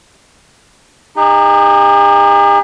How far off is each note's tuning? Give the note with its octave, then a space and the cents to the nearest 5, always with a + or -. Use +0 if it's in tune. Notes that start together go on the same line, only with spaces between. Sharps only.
D#4 -15 G4 +45